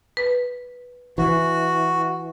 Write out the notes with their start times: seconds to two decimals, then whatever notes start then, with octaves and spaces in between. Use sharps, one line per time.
0.17 B4
1.18 E3 F#4